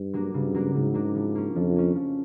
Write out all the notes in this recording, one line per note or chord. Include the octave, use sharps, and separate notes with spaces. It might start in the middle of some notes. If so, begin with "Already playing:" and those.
Already playing: G2
F#3 A#3 D4
G2 C#3
F#3 A#3 D4
G#2 C#3
F#3 A#3 D4
F3
A#3 C#4
F2 F3
A#3 C#4
F3